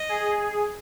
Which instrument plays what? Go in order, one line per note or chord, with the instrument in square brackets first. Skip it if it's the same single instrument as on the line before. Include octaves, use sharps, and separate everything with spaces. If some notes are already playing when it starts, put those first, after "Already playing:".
Already playing: [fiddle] D#5
[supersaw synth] G#4